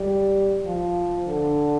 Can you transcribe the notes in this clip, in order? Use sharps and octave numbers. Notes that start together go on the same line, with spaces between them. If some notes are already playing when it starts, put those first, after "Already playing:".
Already playing: G3
F3
D3